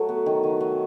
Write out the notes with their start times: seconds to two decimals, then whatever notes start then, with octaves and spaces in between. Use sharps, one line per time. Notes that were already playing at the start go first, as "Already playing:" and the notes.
Already playing: F#3 A3
0.09 B3
0.26 D#3
0.44 D#3
0.60 F#3